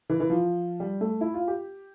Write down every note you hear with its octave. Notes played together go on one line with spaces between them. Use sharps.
E3
E3
F3
G3
A3
E4
F4
G4